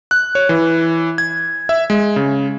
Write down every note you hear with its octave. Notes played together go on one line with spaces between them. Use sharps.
F#6
C#5
E3
G#6
E5
G#3
C#3